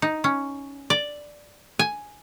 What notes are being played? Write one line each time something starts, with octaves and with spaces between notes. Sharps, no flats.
D#4
C#4
D5
G#5